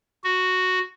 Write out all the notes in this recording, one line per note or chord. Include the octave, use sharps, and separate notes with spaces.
F#4